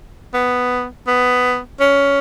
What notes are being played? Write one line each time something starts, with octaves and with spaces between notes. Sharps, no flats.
B3
B3
C#4